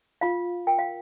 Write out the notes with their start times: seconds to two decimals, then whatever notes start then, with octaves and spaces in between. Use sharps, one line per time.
0.21 F4 F5
0.67 A#4 G5
0.79 F5